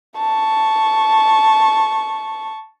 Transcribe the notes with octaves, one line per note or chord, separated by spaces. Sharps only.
A5 C#6